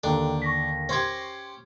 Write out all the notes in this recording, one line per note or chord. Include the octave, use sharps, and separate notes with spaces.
D#2 D3 D4 A4 G5 A#5
C#6 A#6 B6
C#4 G4 C5 C6 G#6